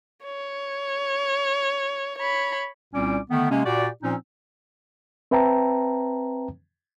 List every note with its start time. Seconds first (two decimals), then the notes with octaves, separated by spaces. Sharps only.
0.25 C#5
2.18 C#5 B5
2.94 C2 A#2 G3 C4 C#4 D6
3.30 D3 D#3 A3 B3
3.50 C3 G#3 A#3 C#4
3.64 A#2 F#4 G4 D5
4.03 A#2 F3 C4 C#4 D#4
5.31 C4 B4 E5 G5 A5 A#5